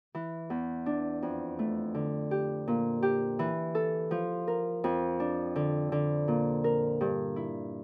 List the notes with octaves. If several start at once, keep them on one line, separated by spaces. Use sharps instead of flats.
E3
E2
D4
F2
A3
D3
G4
A#2
G4
E3
A4
F3
A#4
F2
D4
D3
D3
A#2
A#4
G2
E4